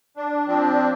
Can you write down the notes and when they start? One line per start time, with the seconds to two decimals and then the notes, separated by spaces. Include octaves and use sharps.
0.17 D4
0.47 F3 C4 D4